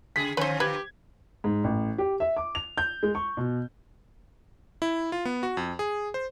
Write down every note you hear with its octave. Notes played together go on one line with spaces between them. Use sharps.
C#3 G#4 B6
A#2 D3 F3 C#4 B4 C5
G4 B4 G#6
G#2
A1
G4
E5
D6
F7
G6
G#3
C#6
B2
E4
F4
B3
F#4
F2
G#4
C5